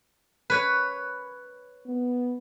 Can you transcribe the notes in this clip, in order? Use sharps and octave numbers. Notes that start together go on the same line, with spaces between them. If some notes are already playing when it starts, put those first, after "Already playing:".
B4 C#5
B3